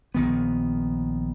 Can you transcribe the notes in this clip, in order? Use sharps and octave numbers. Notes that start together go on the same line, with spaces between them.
A#1 D#3 B3